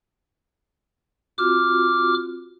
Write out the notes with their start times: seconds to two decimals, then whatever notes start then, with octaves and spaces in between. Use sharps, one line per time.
1.38 C4 F4 F#4 D6 F6